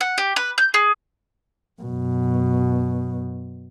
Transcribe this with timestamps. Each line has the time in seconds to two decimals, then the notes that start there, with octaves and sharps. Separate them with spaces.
0.01 F#5
0.18 G4
0.36 B4
0.58 G6
0.74 G#4
1.82 F#2 B2